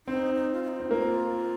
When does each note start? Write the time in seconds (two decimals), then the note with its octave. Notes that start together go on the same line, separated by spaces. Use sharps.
0.07 C4 D#4
0.35 D#4
0.53 F4
0.63 F4
0.68 D#4
0.80 C4
0.91 A#3 F4